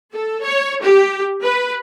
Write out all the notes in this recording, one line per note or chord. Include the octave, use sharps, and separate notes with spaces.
A4
C#5
G4
B4